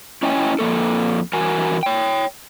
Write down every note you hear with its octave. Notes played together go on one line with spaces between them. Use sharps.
C#4 E4 C#5 D#5 G5 G#5
F2 A#3 A4
E3 F#4 A#4 G#5
C#5 G5